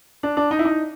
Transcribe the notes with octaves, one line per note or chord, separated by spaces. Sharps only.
D4
D4
D#4
E4
D#4